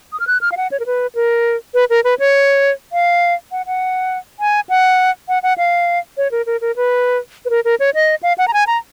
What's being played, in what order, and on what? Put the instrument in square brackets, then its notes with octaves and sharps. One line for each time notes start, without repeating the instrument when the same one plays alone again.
[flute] D#6
F6
F#6
F6
F5
F#5
C#5
A#4
B4
A#4
B4
A#4
B4
C#5
F5
F#5
F#5
G#5
F#5
F#5
F#5
F5
C#5
A#4
A#4
A#4
B4
B4
A#4
A#4
C#5
D#5
F5
F#5
A#5
G#5
A#5